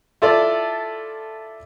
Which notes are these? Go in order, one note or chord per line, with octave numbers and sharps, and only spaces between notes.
E4 F4 A4 D5